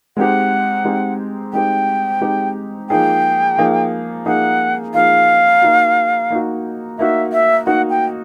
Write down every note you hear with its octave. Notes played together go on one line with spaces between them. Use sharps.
G#3 C4 D#4 G4 F#5
G#3 C4 D#4 G4
G#3 C4 D#4 G4 G5
G#3 C4 D#4 G4
F3 A#3 D#4 G#4 G5
F3 A#3 D#4 G#4
F3 A#3 D#4 G#4 F#5
F3 A#3 D#4 G#4 F5
A#3 D#4 F#4
A#3 D#4 F#4
A#3 D#4 F#4 E5
E5
A#3 D#4 F#4 F#5
G5